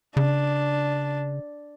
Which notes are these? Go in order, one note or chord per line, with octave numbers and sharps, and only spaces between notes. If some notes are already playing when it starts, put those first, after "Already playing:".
C#3 D4